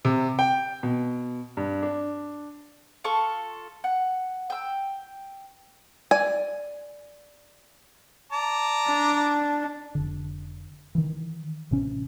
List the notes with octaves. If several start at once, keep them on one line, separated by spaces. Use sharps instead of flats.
C3
G5
B2
G2
D4
F4 A4 C#6
F#5
G5 E6
D5 G#5
D5 A5 A#5
D4
F1 D3
D#3 E3
A1 C3 C#4